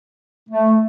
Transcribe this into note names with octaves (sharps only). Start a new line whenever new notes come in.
A3